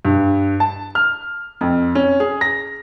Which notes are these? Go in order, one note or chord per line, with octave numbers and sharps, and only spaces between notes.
G2
A5
F6
F2
C#4
G#4
A#6